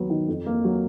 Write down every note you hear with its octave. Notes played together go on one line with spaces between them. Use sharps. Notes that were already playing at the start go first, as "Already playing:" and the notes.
Already playing: D#2 F#3 B3
D#3
F2
A#3
F#3